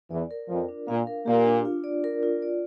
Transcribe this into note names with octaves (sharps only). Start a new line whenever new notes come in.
E2 E3 D5
A#4
F2 F3 F4
D4
A#2 A#3 F5
A#4
A#2 A#3 G4
D4
F4
D5
A#4
F4
D5